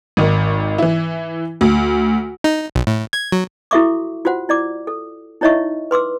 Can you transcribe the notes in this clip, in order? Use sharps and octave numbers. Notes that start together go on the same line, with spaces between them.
G#1 D#3
E3 E4
D2
D#4
B1
A2
G#6
F#3
E4 F#4 A4 E5 C#6 D6
F4 F#4 C5 F#5
E4 D5 D6
A4
D#4 E4 C#5 D#5 E5 C#6
B4 C6 D6 E6